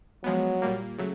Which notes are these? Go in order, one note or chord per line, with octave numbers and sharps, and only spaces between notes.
F3 F#3 G#3 B3
A#2 G3 A#3
C#3 F#3 A3